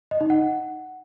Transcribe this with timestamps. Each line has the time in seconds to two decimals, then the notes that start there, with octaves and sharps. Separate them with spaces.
0.11 D#5
0.21 D#4
0.30 F#5